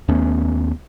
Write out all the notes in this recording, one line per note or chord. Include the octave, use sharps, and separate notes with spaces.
D#2 A3 B3 C#4